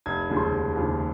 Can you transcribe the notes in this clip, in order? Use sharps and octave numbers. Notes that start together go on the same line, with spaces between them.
F1 G#6
D#2 C#3 F3 G#3
C6
F1
D#2 C#3 F3 G#3